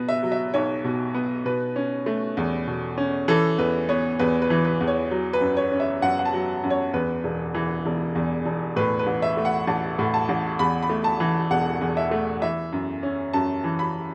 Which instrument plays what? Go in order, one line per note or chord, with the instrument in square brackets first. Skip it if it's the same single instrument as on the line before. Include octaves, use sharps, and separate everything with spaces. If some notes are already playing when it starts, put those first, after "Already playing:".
Already playing: [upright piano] B2 B3
E5
F#3
E5
B1 C#5
B2
B3
B2 B4
C#4
A3
E2
B2
C#4
E3 A4
E2 B4
B3 C#5
E2 B4
B4
E3
B4
E2
C#5
F#3
B4
F#2
C#5
C#4
E5
F#2 F#5
F#5
A5
F#3
F#2
C#5
E2 B4
E1
E3
E1
E2
E1
A2 B4
B4
A1
E5
A3
F#5
A1 A5
A2
A5
A1
E2 B5
B5
A3
A5
E3
E1 F#5
E2
E5
A3
E3 E5
F#2
C#4
F#2 A5
E3
B5